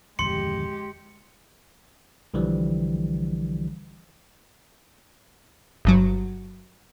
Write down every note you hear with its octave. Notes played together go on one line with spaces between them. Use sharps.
D1 F2 D#3 G#3 G4 C6 C#7
B1 D3 E3 F3 G3
G1 G2 F#3